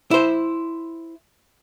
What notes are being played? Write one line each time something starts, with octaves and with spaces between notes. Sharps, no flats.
E4 C5